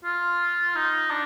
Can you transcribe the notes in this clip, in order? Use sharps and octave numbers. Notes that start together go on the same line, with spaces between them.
F4
D#4
D4